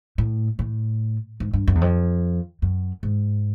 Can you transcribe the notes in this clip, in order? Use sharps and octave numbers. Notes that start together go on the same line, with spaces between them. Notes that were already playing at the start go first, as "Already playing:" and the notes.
A2
A2
G#2
G2
F#2
E2
F2
F#2
G#2